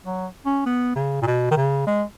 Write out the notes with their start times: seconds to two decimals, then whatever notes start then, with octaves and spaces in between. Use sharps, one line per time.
0.05 F#3
0.46 C#4
0.66 B3
0.96 C#3
1.22 A#2
1.27 B2
1.51 D#3
1.57 C#3
1.87 G#3